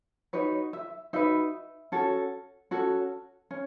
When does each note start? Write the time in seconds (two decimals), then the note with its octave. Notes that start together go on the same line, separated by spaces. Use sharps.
0.33 D#4 F#4 B4 C#5
0.73 E5
1.13 D#4 F#4 B4 E5
1.92 C#4 F#4 A4
2.71 C#4 F#4 A4
3.51 C#4